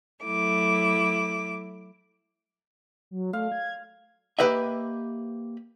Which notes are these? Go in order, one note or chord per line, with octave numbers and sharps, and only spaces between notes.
F#3 A3 E4 D6
F#3
A3 F5
G#6
A#3 G4 B4 D#5 E5